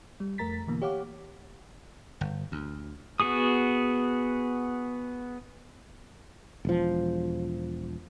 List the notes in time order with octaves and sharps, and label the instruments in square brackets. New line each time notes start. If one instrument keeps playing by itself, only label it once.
[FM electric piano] G3
F2 A3 A#4 A#5 A6 B6
B2 D3 E3 A#3
G4 C#5 F5 F#5 D6
[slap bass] G1
D2
[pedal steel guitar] B3 F#4 G#4 D#6
[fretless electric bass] E1 F3